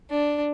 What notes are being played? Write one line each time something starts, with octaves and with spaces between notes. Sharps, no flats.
D4